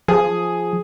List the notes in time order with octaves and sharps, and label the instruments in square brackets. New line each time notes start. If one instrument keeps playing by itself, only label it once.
[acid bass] F3 [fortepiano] G#4